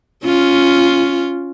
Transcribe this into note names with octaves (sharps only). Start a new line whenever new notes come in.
C#4 F4